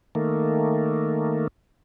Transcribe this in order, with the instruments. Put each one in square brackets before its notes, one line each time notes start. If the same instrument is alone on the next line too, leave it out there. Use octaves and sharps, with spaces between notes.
[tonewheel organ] D#3 A3 A#3